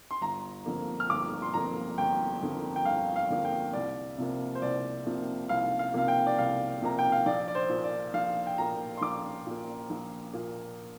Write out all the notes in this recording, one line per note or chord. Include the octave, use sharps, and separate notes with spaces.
C6
G1 A#5
F2 D3 A#3
F6
G1 D6
C6
F2 D3 A#3 A#5
G1 G5
F2 D3 A#3
G5
G1 F5
F5
F2 D3 A#3
G5
C2 D5
C3 F3 A#3
C5
C2 D5
C3 F3 A#3
C2 F5
F5
C3 F3 A#3 F5
G5
D5
C2 F5
C3 F3 A#3 A#5
G5
F5
A#1 D5
D5
C5
A#2 A#3
D5
A#1 F5
G5
A#2 A#3 A#5
C6
A#1 D6
A#2 A#3
A#1
A#2 A#3